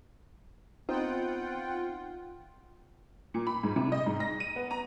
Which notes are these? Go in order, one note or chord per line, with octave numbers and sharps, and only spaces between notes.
B3 C4 D#4 F4 C5 F#5 G5
A#2
B5
G#2
C3
D#5
G#2
A#6
D#7
B3
A#5